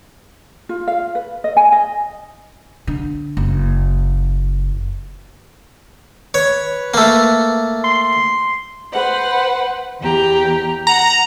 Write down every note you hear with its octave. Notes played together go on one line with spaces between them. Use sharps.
F4
F5
B4
D#5
G#5
D#5
D3
F#1
B4 C#5
A3 A#3
C6
B4 C5 F#5
E2 G4 A#5
F#5 A#5